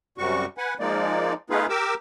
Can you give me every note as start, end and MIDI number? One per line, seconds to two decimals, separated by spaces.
0.18 0.45 42
0.18 0.45 48
0.18 0.45 55
0.18 0.45 66
0.18 0.45 85
0.58 0.74 71
0.58 0.74 78
0.58 0.74 80
0.80 1.33 53
0.80 1.33 56
0.80 1.33 58
0.80 1.33 63
0.80 1.33 74
1.50 1.66 57
1.50 1.66 59
1.50 1.66 63
1.50 1.66 65
1.50 1.66 68
1.50 1.66 71
1.69 1.94 67
1.69 1.94 70
1.69 1.94 86
1.69 1.94 88